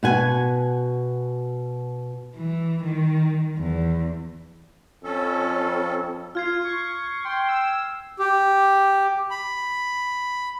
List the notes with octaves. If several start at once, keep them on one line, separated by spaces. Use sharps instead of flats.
B2 F#5 G#5
E3
D#3
E2
F2 C#4 A4
F4 F6 G#6 C7
C#6
G5 C6
E6
G4
B5